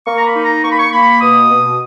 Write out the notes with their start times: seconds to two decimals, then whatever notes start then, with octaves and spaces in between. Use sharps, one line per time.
0.06 A#3 C#6
0.16 A#5
0.26 B5
0.35 D#4
0.45 A#5
0.64 A#3 C#6
0.71 B5
0.79 C#6
0.92 A#3 B5
1.21 B2 D#6
1.49 B2